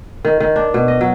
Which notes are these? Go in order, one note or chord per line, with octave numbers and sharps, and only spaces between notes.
D#3
D#3
D4
B2
D#5
F#3